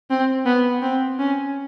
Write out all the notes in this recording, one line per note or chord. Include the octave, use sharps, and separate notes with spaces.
C4
B3
C4
C#4